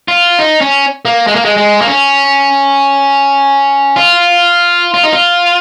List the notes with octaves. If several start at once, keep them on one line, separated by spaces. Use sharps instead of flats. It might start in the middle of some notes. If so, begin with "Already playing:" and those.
F4
D#4
C#4
A#3
G#3
A#3
G#3
G#3
A#3
C#4
F4
F4
D#4
F4